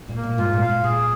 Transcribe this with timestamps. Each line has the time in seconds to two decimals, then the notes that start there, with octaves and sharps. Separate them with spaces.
0.08 A#2
0.16 A#3
0.23 A#2
0.38 G#2 F4
0.53 A#2
0.62 F5
0.69 A#2
0.84 A#2 G#4